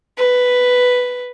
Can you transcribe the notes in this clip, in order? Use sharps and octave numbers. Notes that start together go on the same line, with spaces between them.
B4